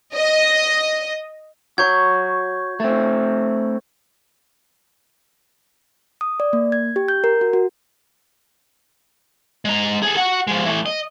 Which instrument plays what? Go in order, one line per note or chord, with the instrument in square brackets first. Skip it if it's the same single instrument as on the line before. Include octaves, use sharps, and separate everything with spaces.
[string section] D#5
[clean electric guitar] F#4 C#5 [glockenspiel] C#6 G6 G#6
[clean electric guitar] A3 C4
[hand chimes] D#6
D5
A#3
G#6
G4
G6
A#4
F#4
F#4
[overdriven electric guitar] G#3 A#5
G#4 A4
F#4 F#5
F3 G#3
E3 A3
D#5